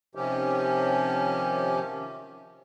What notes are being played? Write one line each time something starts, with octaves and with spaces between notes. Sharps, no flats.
C3 D#3 F3 C#4 G4